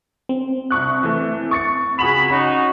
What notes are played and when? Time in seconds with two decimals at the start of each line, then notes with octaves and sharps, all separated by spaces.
0.29 C4
0.71 C2 C#6 F#6
1.03 E3 A3
1.51 C#6 A6 C#7
1.99 C#2 F#4 G#4 A#5 B5 E7
2.31 C#4 D#4 F#4